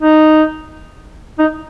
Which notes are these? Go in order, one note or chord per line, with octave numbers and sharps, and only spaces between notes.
D#4
D#4